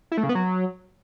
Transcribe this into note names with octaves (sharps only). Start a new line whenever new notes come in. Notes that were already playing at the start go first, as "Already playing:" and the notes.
E4
A3
C#3
B3
F#3